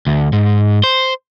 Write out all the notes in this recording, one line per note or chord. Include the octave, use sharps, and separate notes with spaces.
D2
G#2
C5